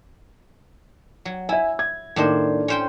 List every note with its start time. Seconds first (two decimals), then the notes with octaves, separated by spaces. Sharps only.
1.25 F#3
1.49 E4 E5 G#5
1.79 G#6
2.16 A2 D#3 A#3 D4 C5
2.68 C#4 C5 G5